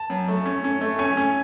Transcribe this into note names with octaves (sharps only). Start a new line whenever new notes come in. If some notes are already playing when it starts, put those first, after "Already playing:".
Already playing: A5
F#2
A3
C#4
C#4
A3
C#4 G#5
C#4